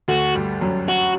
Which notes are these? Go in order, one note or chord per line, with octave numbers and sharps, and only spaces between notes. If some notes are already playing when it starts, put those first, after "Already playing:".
D2 D3 F#4
G2 G3
F#2 F#3
F#4